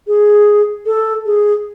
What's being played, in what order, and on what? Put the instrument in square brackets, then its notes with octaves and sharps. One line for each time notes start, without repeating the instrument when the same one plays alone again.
[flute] G#4
A4
G#4